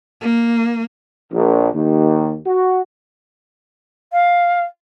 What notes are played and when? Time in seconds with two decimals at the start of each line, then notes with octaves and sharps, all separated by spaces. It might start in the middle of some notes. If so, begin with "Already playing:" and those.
0.21 A#3
1.32 A#1
1.73 D#2
2.46 F#4
4.12 F5